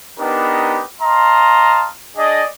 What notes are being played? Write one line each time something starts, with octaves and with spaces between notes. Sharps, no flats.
B3 D4 D#4 G4 A#4 B4
D#5 F5 A5 A#5 C6
D4 G#4 D5 D#5